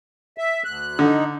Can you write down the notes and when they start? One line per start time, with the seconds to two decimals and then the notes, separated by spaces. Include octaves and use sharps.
0.38 E5
0.65 D2 F#6
0.99 D3 D#4